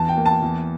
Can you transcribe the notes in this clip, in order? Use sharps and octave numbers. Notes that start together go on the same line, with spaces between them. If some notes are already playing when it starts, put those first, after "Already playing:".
Already playing: E2 A5
G5
A#3
A5
E2